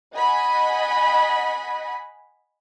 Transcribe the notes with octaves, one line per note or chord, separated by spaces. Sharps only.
D#5 F#5 G#5 B5